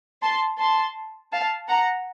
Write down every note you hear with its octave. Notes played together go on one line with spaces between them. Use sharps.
A5 C6
A5 C6
F5 A5
F#5 A#5